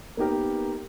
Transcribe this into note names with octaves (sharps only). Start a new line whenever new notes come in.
A#3 B3 D#4 G4 A#4